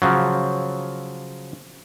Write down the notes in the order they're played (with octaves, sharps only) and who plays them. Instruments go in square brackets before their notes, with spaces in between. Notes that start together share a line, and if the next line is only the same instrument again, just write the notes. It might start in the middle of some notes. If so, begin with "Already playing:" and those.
[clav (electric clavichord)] C#3 F3 F#3